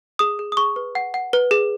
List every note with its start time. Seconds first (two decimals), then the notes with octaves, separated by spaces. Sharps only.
0.19 G#4 D#6
0.39 G#4
0.52 D#6
0.57 G#4 C#6
0.76 B4
0.95 F#5
1.14 F#5
1.33 B4
1.51 G#4